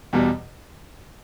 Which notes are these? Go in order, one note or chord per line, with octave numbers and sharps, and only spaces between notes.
E2 B2 G3